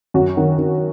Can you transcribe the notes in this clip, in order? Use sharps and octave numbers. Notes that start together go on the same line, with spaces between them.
F#2 F#4
D#3
D#3